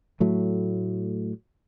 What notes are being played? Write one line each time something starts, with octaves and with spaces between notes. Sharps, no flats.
A2 F#3 A3